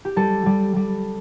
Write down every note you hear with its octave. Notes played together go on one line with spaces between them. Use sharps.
G4
G3 A4
G3
G3